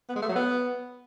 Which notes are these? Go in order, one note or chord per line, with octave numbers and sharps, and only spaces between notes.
B3
G#3
A3
F#3
B3